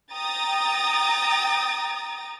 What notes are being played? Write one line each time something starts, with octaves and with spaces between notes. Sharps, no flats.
G5 A#5 D#6 A6